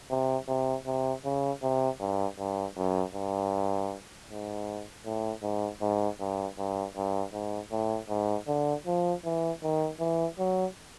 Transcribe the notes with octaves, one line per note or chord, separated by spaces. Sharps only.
C3
C3
C3
C#3
C3
G2
G2
F#2
G2
G#2
A2
G#2
G#2
G2
G2
G2
G#2
A2
G#2
D3
F3
E3
D#3
E3
F#3